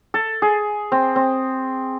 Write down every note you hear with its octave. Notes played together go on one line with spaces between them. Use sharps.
A4
G#4
C4
C4